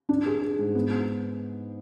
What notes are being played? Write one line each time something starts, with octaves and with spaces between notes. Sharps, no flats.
D4
G#4
G#4
G#2
B3
B3